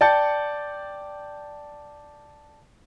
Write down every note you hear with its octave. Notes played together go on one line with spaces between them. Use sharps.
D5 G5 A5 G6 C#7